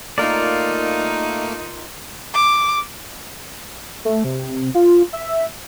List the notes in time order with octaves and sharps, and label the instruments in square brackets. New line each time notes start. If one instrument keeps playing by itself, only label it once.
[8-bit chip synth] A3 A#3 [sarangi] D#4 [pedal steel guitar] F4 A#4 D5
[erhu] D6
[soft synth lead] A3
C3
F4
E5